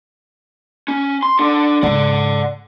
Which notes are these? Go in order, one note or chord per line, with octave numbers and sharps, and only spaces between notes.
C#4
C6
D4 A4
G#2 C#3 D5 F#5